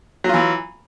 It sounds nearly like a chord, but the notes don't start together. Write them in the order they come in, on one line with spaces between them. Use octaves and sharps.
F#3 F4 E3